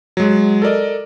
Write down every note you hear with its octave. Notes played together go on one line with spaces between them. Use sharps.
F#3 G#3
A4 A#4 D5 D#5